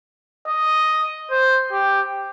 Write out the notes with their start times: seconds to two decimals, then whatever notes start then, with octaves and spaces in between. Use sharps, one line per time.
0.48 D#5
1.31 C5
1.72 G4